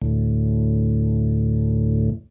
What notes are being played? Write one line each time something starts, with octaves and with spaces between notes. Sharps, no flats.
D2 A2